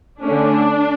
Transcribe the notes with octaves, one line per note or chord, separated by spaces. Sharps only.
D3 A3 C#4 D4